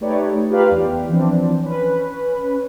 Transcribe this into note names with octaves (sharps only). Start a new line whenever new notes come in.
A3 D#4 G4 B4 C#5 D5
F4 G4 A#4 B4 D5 F5
E2 G4
E3 F3 C4 D4
C#4 B4